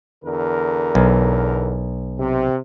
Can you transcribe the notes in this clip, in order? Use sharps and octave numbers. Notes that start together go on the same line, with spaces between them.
E2 D3 A#4
B1
C3